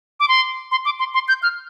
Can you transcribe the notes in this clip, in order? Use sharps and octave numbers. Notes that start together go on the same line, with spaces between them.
D6
C6
C6
D6
C6
C6
G6
F6